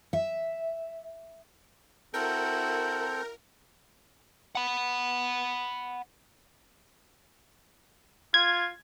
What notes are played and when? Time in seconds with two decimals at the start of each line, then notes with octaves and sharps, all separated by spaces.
0.13 E5
2.14 C4 E4 F#4 A4 A#4 G6
4.55 F#5 B5
8.34 F4 G#6